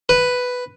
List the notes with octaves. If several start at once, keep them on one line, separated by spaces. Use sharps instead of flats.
B4